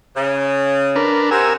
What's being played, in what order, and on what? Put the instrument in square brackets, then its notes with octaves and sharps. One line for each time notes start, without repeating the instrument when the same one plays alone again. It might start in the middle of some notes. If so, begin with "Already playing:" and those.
[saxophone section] C#3
[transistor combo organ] D4 A#4 B4
[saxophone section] C3 F#5 [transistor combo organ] A#4 G#5 E6